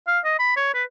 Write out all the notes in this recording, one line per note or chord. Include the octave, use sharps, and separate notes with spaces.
F5
D#5
B5
C#5
B4